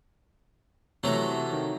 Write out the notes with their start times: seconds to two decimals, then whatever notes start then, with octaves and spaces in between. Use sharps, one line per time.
1.03 C3 E3 F#3 A3 A#5
1.52 D#3